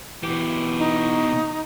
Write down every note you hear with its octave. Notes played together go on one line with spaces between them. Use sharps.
B2 E3 G4
D#4